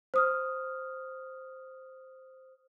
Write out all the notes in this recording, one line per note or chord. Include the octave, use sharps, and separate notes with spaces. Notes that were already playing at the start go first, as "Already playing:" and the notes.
C5 D#6 F6